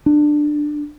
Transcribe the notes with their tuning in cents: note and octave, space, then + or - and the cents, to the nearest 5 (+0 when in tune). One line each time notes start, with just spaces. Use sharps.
D4 +15